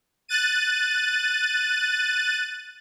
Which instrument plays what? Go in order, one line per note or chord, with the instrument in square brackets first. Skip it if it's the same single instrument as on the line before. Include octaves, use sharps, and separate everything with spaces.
[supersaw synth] F#6 A6 D#7